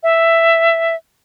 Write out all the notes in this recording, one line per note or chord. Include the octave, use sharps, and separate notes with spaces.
E5